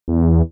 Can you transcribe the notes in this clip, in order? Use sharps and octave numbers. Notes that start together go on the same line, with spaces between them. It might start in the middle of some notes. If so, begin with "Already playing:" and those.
E2